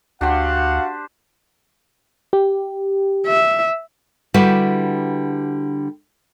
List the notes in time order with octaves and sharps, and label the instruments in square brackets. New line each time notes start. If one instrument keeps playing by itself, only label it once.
[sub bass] D2 [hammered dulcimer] D4 G4 C5 [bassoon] F#4 [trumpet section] F5 F#5
[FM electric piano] G4
[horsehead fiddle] E5
[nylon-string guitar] D3 G3 E4 F#4 G4 B4